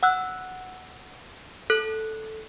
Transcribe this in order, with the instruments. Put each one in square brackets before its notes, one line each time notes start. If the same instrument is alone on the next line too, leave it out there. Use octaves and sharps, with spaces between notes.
[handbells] F#5 E6 F#6
A4 F#6